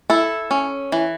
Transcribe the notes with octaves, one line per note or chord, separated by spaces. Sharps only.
E4 A4
C#4
E3